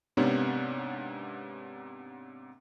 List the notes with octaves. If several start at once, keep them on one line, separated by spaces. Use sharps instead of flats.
G#2 C3 A#3 B3 C#4 D4